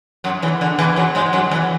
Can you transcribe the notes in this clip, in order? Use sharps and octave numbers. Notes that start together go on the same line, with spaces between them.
F#2 F#3
E2 E3
D3
E2 E3
F#2 F#3
G#2 G#3
F#2 F#3
E2 E3